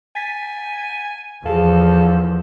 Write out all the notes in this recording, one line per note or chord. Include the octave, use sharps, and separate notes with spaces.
G#5 A6 B6
E2 F3 G#4 A4 F5